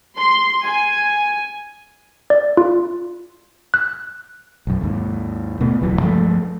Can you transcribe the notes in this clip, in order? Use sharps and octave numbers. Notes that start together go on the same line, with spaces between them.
C6
G#5
D5
F4
F#6
B1 F#2
D#2 G#2
B2 A3 B3
E1 C#2 E3 F#3
G2 F3 G#3 A3